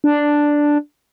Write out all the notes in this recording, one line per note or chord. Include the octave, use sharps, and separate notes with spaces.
D4